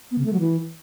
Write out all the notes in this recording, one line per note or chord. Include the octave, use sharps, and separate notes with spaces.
B3
C#3
A3
F#3
E3